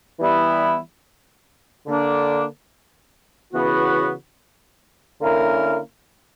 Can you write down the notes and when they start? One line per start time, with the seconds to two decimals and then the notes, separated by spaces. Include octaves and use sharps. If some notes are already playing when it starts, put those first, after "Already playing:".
0.20 E3 G3 B3 E4
1.87 D3 A#3 D4
3.53 C#3 E3 B3 F#4
5.20 D3 A#3 C#4 E4 A#4